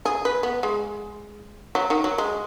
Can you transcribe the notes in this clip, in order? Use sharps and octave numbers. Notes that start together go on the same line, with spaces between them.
G#4
B4
B3
G#3
F#3
D#3
F#3
G#3